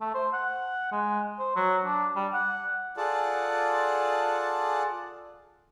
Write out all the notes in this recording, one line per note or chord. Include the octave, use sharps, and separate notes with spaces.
A3
C5
F#5
G#3
C5
F#3
D4
G3
F#5
F4 G#4 A4 D5 F#5 A5